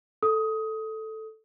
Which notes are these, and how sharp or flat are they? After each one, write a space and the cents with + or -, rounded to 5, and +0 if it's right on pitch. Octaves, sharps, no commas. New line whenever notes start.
A4 +0 D#6 +15